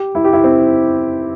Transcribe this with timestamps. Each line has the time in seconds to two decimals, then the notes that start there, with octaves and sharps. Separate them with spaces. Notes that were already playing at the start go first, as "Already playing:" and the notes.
Already playing: G4
0.15 E4
0.24 G4
0.33 E4
0.44 C4